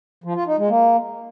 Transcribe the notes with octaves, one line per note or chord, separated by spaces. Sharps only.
F3
F4
D#4
G#3
A#3